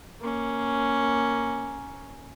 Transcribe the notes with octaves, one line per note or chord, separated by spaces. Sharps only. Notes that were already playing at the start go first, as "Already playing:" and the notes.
A#3 C#4